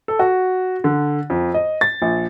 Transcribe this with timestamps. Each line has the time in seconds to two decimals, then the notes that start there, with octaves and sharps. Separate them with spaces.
0.08 A4
0.19 F#4
0.84 D3
1.30 F2
1.54 D#5
1.81 A6
2.02 A#1